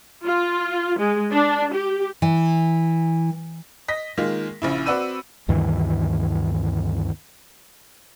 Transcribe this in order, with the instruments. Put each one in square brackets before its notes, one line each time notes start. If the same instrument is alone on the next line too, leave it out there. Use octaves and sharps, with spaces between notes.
[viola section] F4
G#3
D4
G4
[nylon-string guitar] E3
[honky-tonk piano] D#5 A#6 B6
D#3 G#3 A#3 F4
A#1 C#3 E4
C4 F#4 B4 D5 E6 D#7
[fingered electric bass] D2 G2 D#3 E3